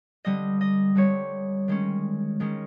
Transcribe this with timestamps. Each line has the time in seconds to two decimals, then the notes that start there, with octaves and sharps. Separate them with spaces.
0.25 D3 G3 C4 D#5
0.61 D#5
0.95 D3 G3 C4 C#5
1.68 D#3 G#3 C#4
2.40 D#3 G#3 C#4